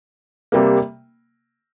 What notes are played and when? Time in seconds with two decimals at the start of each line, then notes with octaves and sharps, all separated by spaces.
0.52 C3 G3 A#3